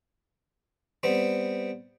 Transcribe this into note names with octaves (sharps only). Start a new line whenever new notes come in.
G3 B3 C4